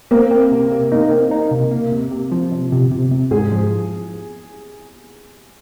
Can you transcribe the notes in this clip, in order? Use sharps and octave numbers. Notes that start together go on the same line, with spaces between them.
A#3 C4
C4
C3
C3
A#3 D#4
C4
D#4
C3
A#3
C3
C3
F3
C3
C3
C3
C3
G#2 G#4
F3